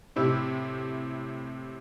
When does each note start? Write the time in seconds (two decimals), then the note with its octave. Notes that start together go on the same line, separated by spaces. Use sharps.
0.16 A2 C3 E4 G4